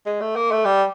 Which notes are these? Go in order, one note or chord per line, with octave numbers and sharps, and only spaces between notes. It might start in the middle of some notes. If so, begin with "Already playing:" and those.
G#3
A3
A#3
A3
G3